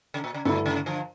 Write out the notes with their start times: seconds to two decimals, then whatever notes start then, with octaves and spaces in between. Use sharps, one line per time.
0.14 C#3
0.24 A#2
0.34 C#3
0.45 G2 A#2 D3 A3 E4
0.66 C#3
0.86 D3 F3